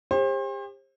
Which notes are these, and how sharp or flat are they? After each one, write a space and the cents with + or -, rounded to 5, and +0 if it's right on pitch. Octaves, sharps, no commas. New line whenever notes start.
G4 +40 C5 +35